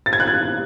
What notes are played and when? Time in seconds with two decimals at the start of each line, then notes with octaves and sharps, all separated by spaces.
0.06 A6
0.13 G#6
0.20 F#6
0.28 G#6